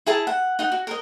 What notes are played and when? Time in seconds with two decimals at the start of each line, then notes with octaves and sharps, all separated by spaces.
0.06 E4 G#4 A5 A#5
0.27 F#5
0.59 D#4 F#5
0.72 F#4
0.87 A#4 D#5